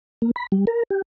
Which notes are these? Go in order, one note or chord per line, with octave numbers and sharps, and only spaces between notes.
A#3
B5
G3
A#4
G4